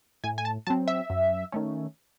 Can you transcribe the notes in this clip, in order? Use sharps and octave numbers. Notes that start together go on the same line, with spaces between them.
A2 G#5
G#5
A5
F#3 C4 A5
E5
F#2
D#3 A3 C#4